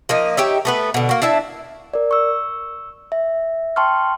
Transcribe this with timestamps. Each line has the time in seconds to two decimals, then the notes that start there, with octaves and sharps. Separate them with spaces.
0.09 F3 A#3 D#4
0.37 D#4 G4 C#5 E5
0.65 A3 B3 B4
0.94 B2 D3
1.09 A#3 F#4
1.22 D4 E4 E5 A5
1.94 A#4 D5
2.11 C#6 E6
3.12 E5
3.76 G5 A5 C6 C#6 F6